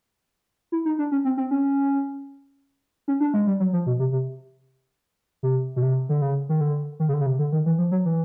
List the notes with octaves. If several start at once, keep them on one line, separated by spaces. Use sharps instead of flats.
E4
D#4
D4
C#4
C4
C4
C#4
C#4
D4
G#3
G3
F#3
F3
B2
C3
C3
C3
B2
C3
D3
C#3
D#3
D3
D#3
C#3
D3
C#3
C3
D3
D#3
E3
F3
F#3
E3